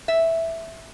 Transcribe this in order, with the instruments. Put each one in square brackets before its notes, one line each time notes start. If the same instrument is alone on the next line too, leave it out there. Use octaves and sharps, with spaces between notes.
[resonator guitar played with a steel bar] E5